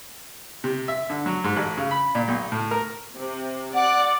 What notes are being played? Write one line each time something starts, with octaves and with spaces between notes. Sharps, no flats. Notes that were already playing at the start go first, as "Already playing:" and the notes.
C3
E5
D3
F#3
G#2
A1
C#3
B5
A#2
B1
A2
A#4
C3
D5 F#5